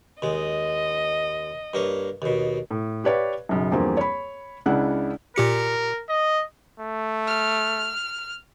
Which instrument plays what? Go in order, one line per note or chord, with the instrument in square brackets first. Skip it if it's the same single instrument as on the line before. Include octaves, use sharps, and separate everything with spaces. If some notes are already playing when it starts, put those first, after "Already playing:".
[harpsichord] D#2 G#3 [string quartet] D#5
[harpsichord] G2 A#3 C#5
D#2 B2
[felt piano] A2
G4 B4 C#5 D5 F5
B1 F#2 C#3
E2 G2 F3 A#3 C4
C#5 B5
C#2 C#3 D4 E4 F#5 F#6
[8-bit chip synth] A#2 G4 C#7 [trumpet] A#4
[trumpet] D#5
[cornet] A3
[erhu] F6